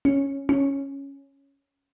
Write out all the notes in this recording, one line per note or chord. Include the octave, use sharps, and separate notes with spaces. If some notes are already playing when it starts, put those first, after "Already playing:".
C#4
C#4